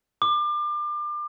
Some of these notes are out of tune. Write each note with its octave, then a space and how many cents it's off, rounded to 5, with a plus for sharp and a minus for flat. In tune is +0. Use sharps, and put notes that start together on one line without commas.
D6 +30